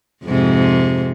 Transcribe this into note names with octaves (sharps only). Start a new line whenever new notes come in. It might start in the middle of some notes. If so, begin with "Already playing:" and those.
F2 G#2 C3